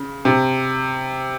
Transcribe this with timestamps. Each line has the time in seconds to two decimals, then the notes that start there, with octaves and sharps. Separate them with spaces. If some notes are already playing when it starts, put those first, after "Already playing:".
Already playing: C#3
0.25 C3